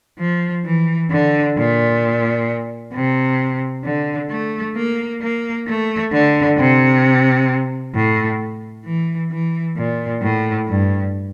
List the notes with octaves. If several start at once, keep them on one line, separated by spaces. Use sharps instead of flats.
F3
E3
D3
A#2
C3
D3
A3
A#3
A#3
A3
D3
C3
A2
E3
E3
A#2
A2
G2